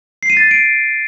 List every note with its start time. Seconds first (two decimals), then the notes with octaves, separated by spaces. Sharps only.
0.23 C7
0.30 D#7
0.37 A6
0.44 C7
0.51 D7